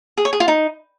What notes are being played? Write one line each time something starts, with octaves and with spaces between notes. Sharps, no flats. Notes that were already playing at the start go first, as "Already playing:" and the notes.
G#4
C#5
G#4
F4
D#4